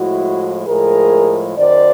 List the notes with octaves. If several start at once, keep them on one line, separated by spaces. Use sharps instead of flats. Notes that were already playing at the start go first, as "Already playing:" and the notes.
Already playing: A2 F3 G#3 E4 F#4
A2 F3 G#3 G#4 A#4
F#2 D#3 F#3 C5 D5